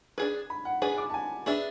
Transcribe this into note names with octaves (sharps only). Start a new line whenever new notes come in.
D4 G#4 B4 G#6
B5
F#5
D4 G#4 B4 G#5
D6
A5
G#5
D4 G#4 B4 E5